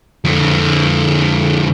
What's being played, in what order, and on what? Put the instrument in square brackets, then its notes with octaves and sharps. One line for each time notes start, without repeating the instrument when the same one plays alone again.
[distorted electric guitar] F2 D3